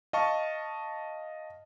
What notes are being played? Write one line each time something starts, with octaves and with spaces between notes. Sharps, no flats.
D#5 F5 A5 C#6